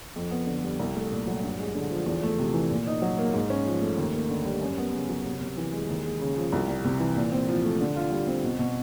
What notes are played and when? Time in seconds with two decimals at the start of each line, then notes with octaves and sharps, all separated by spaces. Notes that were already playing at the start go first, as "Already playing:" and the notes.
0.16 F2
0.31 B3
0.47 D3
0.64 G3
0.79 C2
0.96 A3
1.12 A#2
1.27 F#3
1.43 G2
1.59 G#3
1.75 D3
1.90 F3
2.06 E2
2.23 A3
2.39 C3
2.54 E3
2.71 A#2
2.87 D#4
3.02 F#3
3.19 A#3
3.33 G#2
3.50 C#4
3.66 F3
3.81 A3
3.98 D#2
4.14 A#3
4.30 D3
4.45 G3
4.62 F#2
4.78 B3
4.93 C#3
5.09 F#3
5.25 C3
5.41 C3
5.57 E3
5.73 G#3
5.89 D#2
6.05 G#3
6.21 C#3
6.36 F3
6.52 C2
6.68 G3
6.84 C3
7.00 E3
7.16 A#2
7.32 C4
7.48 F3
7.64 A3
7.81 D3
7.96 F4
8.12 G3
8.28 C4
8.44 B2
8.59 B2